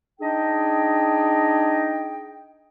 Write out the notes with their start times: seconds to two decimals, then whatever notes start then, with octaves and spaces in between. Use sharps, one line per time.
0.21 D4 D#4 G#4 D#5 G5